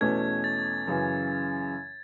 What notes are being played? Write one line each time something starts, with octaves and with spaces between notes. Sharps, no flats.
E2 B2 A3 C#4 G#6
A6
F#2 C#3 E3